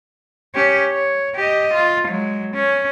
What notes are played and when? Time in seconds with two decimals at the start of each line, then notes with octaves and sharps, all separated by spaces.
0.55 C#4 G4
0.92 C#5
1.36 G4 D#5
1.74 F4
2.08 F#3 G#3
2.54 C#4